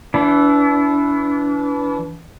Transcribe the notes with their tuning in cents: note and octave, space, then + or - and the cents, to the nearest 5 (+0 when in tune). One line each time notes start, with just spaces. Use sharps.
E3 +0 D4 -40